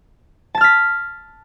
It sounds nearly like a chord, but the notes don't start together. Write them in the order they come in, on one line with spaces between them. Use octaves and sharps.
A5 A6 F6 B6